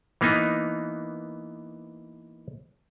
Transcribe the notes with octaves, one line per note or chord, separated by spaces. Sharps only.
E3 A#3 B3 D#4